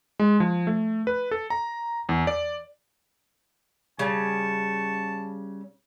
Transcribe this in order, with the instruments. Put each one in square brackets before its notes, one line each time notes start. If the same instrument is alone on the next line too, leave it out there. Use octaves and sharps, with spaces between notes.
[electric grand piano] G#3
F3
A3
B4
A4
A#5
E2
D5
[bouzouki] C#3 [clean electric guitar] G3 [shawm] A5 [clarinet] C#6